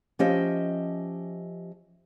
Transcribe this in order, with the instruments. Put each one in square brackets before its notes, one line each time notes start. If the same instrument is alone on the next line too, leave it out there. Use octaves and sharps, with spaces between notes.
[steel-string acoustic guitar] F3 C#4 G4 D#5 E5